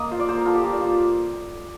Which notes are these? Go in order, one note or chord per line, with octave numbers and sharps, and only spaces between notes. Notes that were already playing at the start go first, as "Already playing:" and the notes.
Already playing: A#3 D#5
F4 C5
D5
A#3 C5
A#4
F4 A4
G4
A#3 A#4
D5
F4 C5